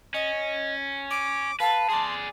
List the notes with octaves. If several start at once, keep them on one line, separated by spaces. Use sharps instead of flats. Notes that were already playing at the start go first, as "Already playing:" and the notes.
C#4 D#5
D6
B4 F5 A5
G#4 D5 C6